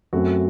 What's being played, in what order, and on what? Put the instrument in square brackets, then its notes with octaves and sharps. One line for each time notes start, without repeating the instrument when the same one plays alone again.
[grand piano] F#2 F#3 A3 C4 F#4 A4